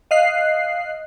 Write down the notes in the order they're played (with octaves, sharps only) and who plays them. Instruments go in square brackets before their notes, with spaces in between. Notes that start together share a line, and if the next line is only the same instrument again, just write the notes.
[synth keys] D#5 F5 F#6 C7